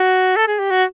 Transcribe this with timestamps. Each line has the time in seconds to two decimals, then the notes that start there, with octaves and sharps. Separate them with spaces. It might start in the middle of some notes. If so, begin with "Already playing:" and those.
Already playing: F#4
0.37 A4
0.48 G#4
0.59 G4
0.70 F#4